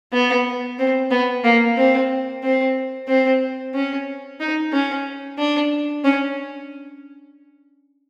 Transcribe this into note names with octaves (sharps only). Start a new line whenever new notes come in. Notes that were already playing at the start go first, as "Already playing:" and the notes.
B3
C4
B3
A#3
C4
C4
C4
C#4
D#4
C#4
D4
C#4